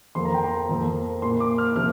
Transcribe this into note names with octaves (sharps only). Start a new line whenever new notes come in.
F2 F3 A#3 C6
A#5
G5
A#5
F2 F3 A#3
A#2 A#3 C6
D6
F6
C3 F3 A#3 F6